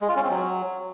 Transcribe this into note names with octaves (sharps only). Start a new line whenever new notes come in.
G#3
F4
C#4
C4
F#3